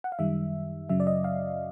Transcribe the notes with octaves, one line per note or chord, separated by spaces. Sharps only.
F#5
F5
F#2 D#3 G3 E5
F#2 C#3 F#3 E5
D5
D#5
F5